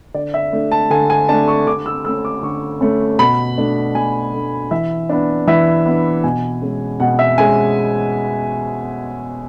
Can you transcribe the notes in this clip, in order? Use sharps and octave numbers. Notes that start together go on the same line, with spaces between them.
D3 D5
E5
A3 D4
A5
D3 G#5
G#5
A3 D4 A5
C#6
D3 D6
E6
A3 C#4 E6
D6
D3 C#6
A3 C#4
B2 B5
A3 D4
B2 G#5
A3 D4
E3 E5
B3 D4
E3 E5
B3 D4
B2 G#5
G#3 C#4
B2 F#5
E5
G#3 C#4 G#5